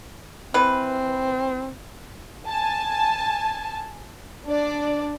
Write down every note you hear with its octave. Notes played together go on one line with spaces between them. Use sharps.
E3 C4 B4
G#5 A5
D4 D5